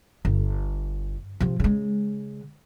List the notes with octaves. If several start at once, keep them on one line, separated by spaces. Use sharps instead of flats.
G1
C3 F3
C#3 G#3